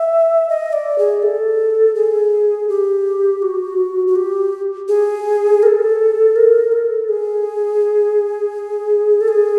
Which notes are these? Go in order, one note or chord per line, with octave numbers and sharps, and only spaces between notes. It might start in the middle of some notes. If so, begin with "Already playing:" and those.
Already playing: E5
D#5
D5
G#4
A4
G#4
G4
F#4
F#4
G4
G#4
A#4
A4
A#4
A4
G#4
A4
G#4